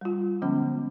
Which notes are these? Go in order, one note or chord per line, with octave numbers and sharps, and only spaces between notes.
G3 F4
D3 F3 G#3 B3 C#4